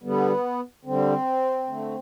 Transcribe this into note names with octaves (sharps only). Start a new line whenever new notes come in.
D3 G3 B3
D3 G3 C4
D3 A3